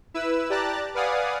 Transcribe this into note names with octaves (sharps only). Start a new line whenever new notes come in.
E4 B4 E6
G4 D5 A5 A#5 F#6 A6
B4 D5 F5 F#5 G#5 D#6